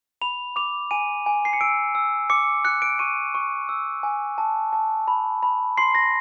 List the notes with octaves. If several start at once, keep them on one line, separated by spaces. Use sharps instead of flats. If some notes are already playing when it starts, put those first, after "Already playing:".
B5 F7
D6 F7
G#5 D#7
G#5
C7
C#7
E6 D7
E6
D6 C#7
F#6 C#7
D7
C#6 D#7
C#6
E6
G#5
A5
A5
B5
B5
C6 C7
A#6